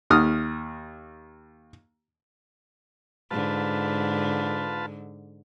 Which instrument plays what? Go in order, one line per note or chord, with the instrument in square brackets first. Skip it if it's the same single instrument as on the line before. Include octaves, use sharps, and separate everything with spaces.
[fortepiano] D#2 D#6 F6
[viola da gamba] G#2 D3 [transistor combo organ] F4 B4 A5